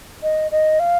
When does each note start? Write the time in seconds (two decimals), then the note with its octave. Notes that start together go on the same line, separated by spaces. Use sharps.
0.23 D#5
0.51 D#5
0.80 F5